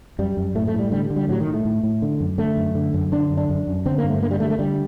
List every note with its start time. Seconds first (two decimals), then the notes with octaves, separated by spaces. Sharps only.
0.19 F#2 G3
0.37 F#2
0.55 A2 A3
0.67 A3
0.74 A2
0.79 G3
0.91 D3 G3
1.10 D3
1.16 G3
1.29 A2 F#3
1.40 D#3
1.47 A2
1.54 A3
1.65 A2
1.83 A2
2.02 D3
2.20 F#2
2.38 D3 A3
2.57 F#2
2.75 D3
2.94 F#2
3.12 D3 D4
3.30 F#2
3.37 D4
3.49 F#2
3.67 F#2
3.86 D3 C4
3.98 A#3
4.04 G2
4.10 A3
4.22 D3 A#3
4.31 G3
4.40 D3 A3
4.50 A3
4.59 D3 G3